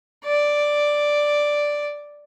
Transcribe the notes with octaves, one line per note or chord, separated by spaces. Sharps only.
D5